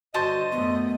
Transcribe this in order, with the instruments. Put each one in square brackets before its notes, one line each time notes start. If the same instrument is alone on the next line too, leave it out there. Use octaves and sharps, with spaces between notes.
[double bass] G2 D3 [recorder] F#4 [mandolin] C5 A5 [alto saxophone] D#5
[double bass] F#2 A3 [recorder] B3